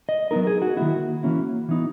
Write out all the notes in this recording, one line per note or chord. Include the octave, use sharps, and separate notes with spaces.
D#5
F#3 B3 D#4 A#4
G#4
F#4
D#3 A#3 E4 F#4
E3 A#3 C#4 E4
E3 B3 D#4